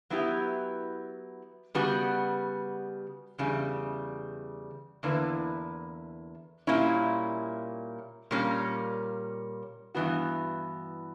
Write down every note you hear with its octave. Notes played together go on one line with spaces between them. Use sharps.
F#3 B3 E4 G4
C#3 G3 B3 F#4
E2 C#3 G3
E2 D3 A#3 E4 B4
A#2 G3 A#3 C#4 E4
A#2 G3 A#3 C#4
G2 E3 B3 F#4